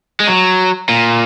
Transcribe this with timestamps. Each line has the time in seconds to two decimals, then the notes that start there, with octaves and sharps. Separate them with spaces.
0.20 G#3
0.28 F#3
0.89 A#2